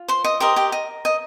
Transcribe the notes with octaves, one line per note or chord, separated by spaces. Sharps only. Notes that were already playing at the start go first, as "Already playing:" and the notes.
Already playing: F4
C5 C6
D#5 D#6
G4 A#4 C5 D#5 C6
G4 G5
D#5
D#5